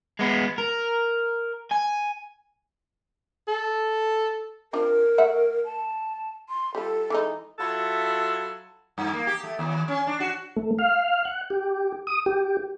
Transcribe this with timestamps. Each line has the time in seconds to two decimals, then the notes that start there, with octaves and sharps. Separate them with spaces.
0.20 G#3 B3
0.58 A#4
1.71 G#5
3.48 A4
4.73 C4 D4 F4 A#4
5.18 A3 E5 F#5
5.65 A5
6.49 C6
6.75 G3 F4 A4
7.10 E3 G#3 D#4
7.59 F#3 E4 F4 A4
8.98 G2
9.13 A#3
9.27 G4
9.44 A3
9.59 D#2
9.88 C#4
10.07 D4
10.20 F#4
10.56 A3
10.79 F5
11.25 F#5
11.50 G4
12.07 D#6
12.26 G4